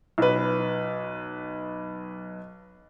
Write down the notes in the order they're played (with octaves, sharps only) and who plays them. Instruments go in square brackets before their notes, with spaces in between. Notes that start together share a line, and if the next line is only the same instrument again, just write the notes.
[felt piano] B1 B4